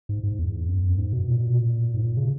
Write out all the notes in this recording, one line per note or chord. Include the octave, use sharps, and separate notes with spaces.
G#2
G#2
E2
F#2
G#2
B2
A#2
B2
A#2
G#2
A#2
C#3